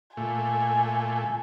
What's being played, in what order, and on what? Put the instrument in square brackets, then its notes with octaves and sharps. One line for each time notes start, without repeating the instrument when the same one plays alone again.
[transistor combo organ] A#2 A3 [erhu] G#5